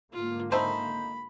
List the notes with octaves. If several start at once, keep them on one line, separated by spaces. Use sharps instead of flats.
G#2 D3 A#3 F4
A3 C4 D#4 C5 B5